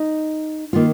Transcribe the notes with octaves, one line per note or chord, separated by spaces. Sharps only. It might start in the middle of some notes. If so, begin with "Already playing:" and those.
Already playing: D#4
D#3 A#3 F4